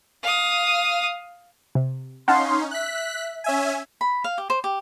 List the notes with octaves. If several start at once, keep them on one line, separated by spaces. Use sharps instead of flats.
F5 D#6
C3
C#4 D#4 F5 F#5 A5 C6 F6
E5 F#6 B6
C#4 E5 G#5
B5
F5
G4
C5
G4